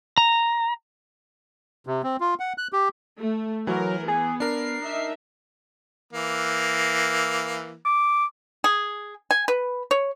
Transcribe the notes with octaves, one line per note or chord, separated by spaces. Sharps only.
A#5
C3
C4
F4
F#5
F#6
G4
A3
E3 F#3 A#4
B3 G#4
D4 A#4 C7
D#4 E5
E3 A#3
D6
G#4
G#5
B4
C#5